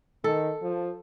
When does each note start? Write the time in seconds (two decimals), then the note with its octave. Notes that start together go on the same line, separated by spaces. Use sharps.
0.24 D#3 A4
0.62 F3